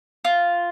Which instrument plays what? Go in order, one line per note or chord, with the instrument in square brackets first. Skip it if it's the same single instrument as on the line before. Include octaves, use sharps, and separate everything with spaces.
[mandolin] F4